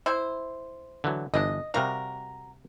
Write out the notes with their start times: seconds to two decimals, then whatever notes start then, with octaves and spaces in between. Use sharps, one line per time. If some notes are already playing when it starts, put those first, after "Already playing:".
0.06 E4 C5
1.04 D3 E3 F#3
1.34 G1 E3 D4 D#5
1.74 C3 G3 F#4 A#4 F5